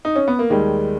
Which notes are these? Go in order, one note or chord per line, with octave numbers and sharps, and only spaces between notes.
D#4
C#4
B3
A#3
D#2 D#3 G3 G#3